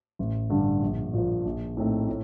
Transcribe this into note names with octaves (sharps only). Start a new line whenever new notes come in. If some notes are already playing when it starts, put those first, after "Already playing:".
A1
G2 D3 G3
A#1
A#2 F3
A#1
A2 A3 C4 D#4
A2